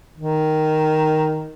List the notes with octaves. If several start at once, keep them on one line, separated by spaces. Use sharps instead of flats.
D#3